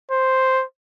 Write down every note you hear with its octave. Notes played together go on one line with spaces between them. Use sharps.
C5